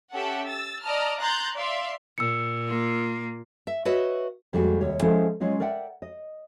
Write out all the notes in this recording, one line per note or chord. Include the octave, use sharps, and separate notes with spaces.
C#4 G4 A4 E5 F#5 A5
E6 A6
D5 D#5 A5 A#5 F6
A#5 C6 F#6 G6 A6
D5 E5 F5 C6
A#2 E6 C#7
A#3 F4
E5
F#4 B4 C#5 D#5 E5
F2 G3 G#3 A#3 F#4
D#2 C3 G3 C#5
F3 G#3 C#4 E4 A4 C5
F#3 G#3 C#4 F4 D#5
A#4 D5 E5 F#5 G5
D#5